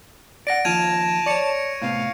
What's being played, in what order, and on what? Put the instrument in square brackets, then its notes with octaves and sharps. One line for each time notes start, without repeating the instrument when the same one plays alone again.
[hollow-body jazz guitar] D5 F#5 [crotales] A#6 D7
[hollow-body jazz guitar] D#2 F3 F4 [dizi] A5 [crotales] G#6 D#7 F7
[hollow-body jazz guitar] C#5 D5 [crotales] C#6 C#7
[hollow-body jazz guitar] A2 C3 B3 [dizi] F5